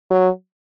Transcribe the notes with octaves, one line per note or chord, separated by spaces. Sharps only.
F#3